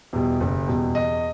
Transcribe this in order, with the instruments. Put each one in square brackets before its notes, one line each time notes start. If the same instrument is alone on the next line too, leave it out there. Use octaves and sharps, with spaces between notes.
[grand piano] E2 B2 G3
F#1
E2 B2 G3
E2 D#5